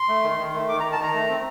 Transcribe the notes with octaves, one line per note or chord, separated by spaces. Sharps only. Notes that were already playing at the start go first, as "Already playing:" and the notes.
Already playing: C6
A3
D#3
D#3
A3
D#3 D6
A#5
D#3
A5
D#3 A#5
A3
C4